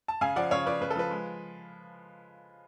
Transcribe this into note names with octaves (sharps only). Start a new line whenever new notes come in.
A5
C#3 F5 G#5
F3 D5 F#5
C#3 C#5 F5
F3 B4 D5
C#3 B4
A4
F3 B4
G#3